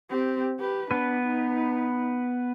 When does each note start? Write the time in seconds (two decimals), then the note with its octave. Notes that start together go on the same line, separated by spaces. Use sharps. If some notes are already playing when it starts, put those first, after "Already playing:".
0.10 C4 G4
0.60 G4 B4
0.91 B3 D4 B4
1.26 D#4